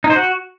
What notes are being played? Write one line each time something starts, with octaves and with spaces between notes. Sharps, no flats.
D#4
C5
F#4